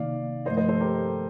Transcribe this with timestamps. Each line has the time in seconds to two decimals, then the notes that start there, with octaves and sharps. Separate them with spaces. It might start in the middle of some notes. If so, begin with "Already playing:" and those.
Already playing: C3 D#3 A#3 D#4 D5 F5
0.45 G2 F3 A3 C5 D#5
0.57 C5 D#5
0.69 A4 C5
0.81 G4 A#4